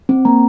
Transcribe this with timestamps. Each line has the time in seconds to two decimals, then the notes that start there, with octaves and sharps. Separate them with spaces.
0.09 C4
0.25 A#3 A#5